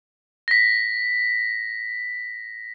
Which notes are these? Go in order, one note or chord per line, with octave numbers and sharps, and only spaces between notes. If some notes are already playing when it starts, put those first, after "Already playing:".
A#6 B6